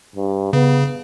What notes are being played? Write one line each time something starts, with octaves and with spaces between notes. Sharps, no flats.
G2
C#3 B3